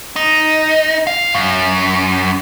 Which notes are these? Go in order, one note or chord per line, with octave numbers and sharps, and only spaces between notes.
D#4
F5
F#2